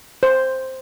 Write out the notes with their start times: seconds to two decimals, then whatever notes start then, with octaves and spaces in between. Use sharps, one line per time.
0.23 C5